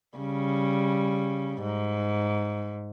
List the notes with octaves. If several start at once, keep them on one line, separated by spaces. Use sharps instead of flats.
C#3 G3
G#2